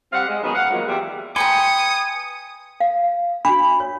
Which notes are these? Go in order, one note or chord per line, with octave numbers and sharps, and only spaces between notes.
G3 C4 F5 F#5
G#3
D#3 F#3 B3 C#4 D#4 G#4
F5 F#5
D#3 F3 F#3 G#3 A#3
E2 G3 E5
B4 G5 G#5 A#5 C6 D#6 C#7
F5
D4 F#4 B5
C#5